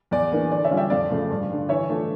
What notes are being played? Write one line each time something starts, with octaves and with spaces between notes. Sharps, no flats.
E2 D5
E3 A#3 D4
D3 D5
C#5 E5
G3 C#4 F4
E5 G5
F2 D5 F5
C#3 F3 A3
G2
D3 G3
E3 C#5 E5
A3 D4 F4